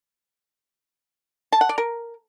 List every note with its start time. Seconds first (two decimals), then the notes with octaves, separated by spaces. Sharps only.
1.52 A5
1.61 F#5
1.69 D5
1.78 A#4